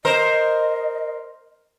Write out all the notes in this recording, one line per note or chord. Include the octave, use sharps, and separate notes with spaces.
A#4 C5 D#5